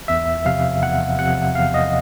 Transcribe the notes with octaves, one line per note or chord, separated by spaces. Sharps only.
E2 E5
C3 F3 F5
E2 F#5
C3 F3 F#5
E2 F5
D#5